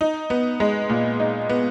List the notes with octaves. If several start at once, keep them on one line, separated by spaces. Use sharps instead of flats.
D#4
B3
G#3
A#2
D#4
B3